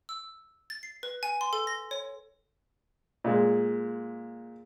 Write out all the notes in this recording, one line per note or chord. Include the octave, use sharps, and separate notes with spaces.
E6
A6
C7
B4
G#5
C6
A4
A#6
C#5
A#2 G#3